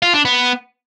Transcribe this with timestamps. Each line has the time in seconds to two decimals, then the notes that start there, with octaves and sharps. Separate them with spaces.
0.02 F4
0.14 D4
0.25 B3